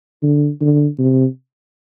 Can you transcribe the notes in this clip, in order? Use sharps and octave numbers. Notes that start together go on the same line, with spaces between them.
D3
D3
C3